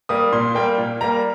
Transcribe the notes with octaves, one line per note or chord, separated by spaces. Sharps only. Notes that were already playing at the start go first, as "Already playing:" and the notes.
G3 A#3 D#6
A#2 C6
G3 A#3 G5
A#2
G3 A#3 A#5